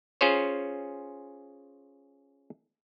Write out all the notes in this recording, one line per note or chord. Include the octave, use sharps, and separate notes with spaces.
C#4 F4 G#4 C5 C#5